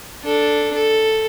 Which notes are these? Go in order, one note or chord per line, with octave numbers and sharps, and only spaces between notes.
D4 A4
A4